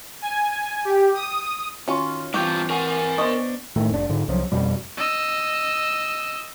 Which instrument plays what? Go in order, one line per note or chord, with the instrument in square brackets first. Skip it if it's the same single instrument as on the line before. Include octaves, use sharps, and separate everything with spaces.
[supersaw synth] G#5
G4
D#6
[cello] D#3 [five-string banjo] C#4 F4 [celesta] F#4 C6 C#6
[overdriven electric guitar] G2 F4 [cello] E3 C4 [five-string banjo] G4 [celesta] C#6 G6
[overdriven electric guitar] A#4 G#5 [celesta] F#5 C#6
[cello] B3 D4 [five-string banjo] C5 D#5 [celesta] C#6
[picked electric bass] A2 D#3 A3
F1 C4 D4
G#2 D3
C2 F3 F#3
F2 B2 G3
[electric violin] D#5 E6